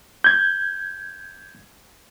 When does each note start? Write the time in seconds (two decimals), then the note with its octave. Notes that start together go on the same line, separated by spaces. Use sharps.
0.24 G6 G#6